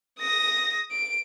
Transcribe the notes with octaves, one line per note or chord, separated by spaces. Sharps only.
D#6 A#6
D7